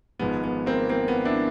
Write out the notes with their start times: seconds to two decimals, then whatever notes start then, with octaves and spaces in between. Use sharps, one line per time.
0.19 G#1 G#2 F3 G#3 B3
0.44 B3
0.66 A#3 C4
0.89 A#3 C4
1.08 B3
1.25 D4 E4